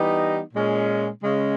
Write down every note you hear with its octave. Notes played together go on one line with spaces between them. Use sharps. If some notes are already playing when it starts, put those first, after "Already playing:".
Already playing: E3 G3 B3 D#4 G4
A#2 G#3 C#4
C#3 G#3 C#4